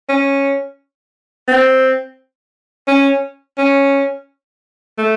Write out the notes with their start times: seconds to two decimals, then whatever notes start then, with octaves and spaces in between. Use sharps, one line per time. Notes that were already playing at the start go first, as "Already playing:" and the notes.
0.09 C#4
1.48 C4
2.88 C#4
3.58 C#4
4.98 A3